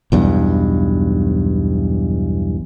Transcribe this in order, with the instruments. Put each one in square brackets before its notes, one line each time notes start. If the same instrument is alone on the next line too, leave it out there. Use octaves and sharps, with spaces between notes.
[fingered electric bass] B1 E2 G2